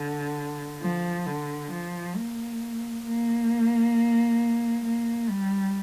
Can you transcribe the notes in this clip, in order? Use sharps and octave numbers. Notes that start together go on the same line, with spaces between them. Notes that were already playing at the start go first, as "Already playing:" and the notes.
Already playing: D3
F3
D3
F3
A#3
A#3
A#3
G3